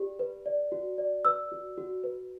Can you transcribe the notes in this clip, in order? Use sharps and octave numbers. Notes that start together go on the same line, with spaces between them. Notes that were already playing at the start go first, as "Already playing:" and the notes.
Already playing: G4 D5
B4
D5
F#4
D5
B4 E6
F#4
F#4
B4